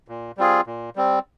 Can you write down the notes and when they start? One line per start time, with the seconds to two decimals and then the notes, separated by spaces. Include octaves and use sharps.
0.08 A#2
0.37 G3 C4 F4 G#4
0.67 A#2
0.96 G3 C4